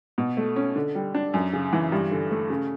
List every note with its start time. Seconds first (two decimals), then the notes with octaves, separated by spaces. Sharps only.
0.18 B2
0.37 A3
0.56 C#4
0.76 D3
0.95 G3
1.15 D4
1.34 F#2
1.53 C#3
1.73 E3
1.92 G2
2.11 D3
2.31 A3
2.50 C#3